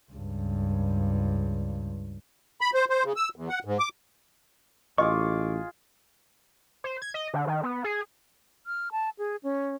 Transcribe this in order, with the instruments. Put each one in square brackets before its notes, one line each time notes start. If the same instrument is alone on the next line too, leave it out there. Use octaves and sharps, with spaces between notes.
[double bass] C#2 G2
[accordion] B5
C5
C5
C#3
E6
E2
F#5
G#2
D6
[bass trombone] A1 [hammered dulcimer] F4 G#4 [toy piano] D#5 [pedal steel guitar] C#6 D6
[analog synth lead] C5
G#6
D#5
D3
D#3
B3
G#4
[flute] F6
A5
G#4
C#4